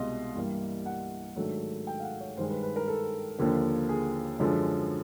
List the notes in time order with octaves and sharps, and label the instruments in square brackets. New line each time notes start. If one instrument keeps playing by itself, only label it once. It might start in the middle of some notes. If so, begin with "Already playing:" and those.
Already playing: [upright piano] C2 B2 G#3 D#5 F5 C6
G2 E3 G3 A#3
F#5
G#2 D#3 F#3 A3 D4
G5
F5
F#5
C#5
G2 D#3 G#3 C5
B4
B4
A#4
A4
D#2 D3 F3 A#3
G#4
F#2 D3 F3 G#3